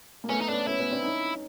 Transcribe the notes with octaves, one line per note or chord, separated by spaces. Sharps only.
A#3
A3 B3 C#4
D#4
B3 C#4 D4
B3 C#4 E4
B3 C#4
C4 D4
C#4 D#4